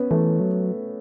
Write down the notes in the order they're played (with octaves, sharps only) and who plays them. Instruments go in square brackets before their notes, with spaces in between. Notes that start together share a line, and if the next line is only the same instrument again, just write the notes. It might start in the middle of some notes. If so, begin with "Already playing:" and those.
Already playing: [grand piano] B3 C#4
[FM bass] E3 [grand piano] A3
[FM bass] F#3